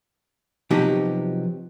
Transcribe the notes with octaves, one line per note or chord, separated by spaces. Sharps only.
C3 F3 F#3 B3 D#4 G4